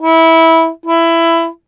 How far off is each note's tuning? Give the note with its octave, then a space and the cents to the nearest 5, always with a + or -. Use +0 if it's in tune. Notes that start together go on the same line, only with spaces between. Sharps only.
E4 -15
E4 +15